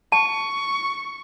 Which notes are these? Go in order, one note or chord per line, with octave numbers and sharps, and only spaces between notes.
A5 C#6